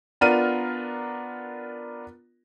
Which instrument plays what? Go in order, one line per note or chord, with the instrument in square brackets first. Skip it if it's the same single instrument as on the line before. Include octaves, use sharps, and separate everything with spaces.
[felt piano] B3 D4 F4 A#4 F6 D#7